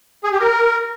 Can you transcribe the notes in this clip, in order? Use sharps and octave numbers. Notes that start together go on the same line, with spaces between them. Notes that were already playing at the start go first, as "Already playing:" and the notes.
G#4
G4
A#4